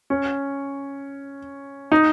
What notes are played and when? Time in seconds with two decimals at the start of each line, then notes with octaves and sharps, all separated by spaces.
0.10 C#4
1.92 D#4